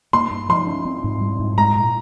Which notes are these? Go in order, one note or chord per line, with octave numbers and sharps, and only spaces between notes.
A#3 C6
G2
F3 C6
C#4
C4
G#2
G3
G#2
G#3 A#5
A#2